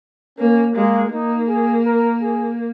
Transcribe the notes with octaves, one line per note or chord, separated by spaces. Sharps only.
A#3 C#4
G#3 A#3
A#3 D#4
G#4
A#4
G#4